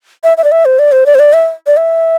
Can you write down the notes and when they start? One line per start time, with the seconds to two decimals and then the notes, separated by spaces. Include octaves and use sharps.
0.24 E5
0.37 E5
0.44 D5
0.52 E5
0.65 C5
0.79 D5
0.92 C5
1.06 D5
1.15 C5
1.19 D5
1.33 E5
1.67 D5
1.77 E5